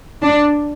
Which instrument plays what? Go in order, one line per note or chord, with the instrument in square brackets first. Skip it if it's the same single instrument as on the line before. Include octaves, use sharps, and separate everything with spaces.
[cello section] D4